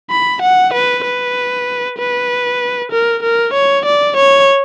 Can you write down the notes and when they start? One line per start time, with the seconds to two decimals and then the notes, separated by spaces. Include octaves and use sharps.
0.10 B5
0.42 F#5
0.74 B4
1.05 B4
1.98 B4
2.92 A#4
3.23 A#4
3.54 C#5
3.86 D5
4.17 C#5